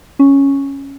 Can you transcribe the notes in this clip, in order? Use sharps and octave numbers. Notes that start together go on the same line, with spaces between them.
C#4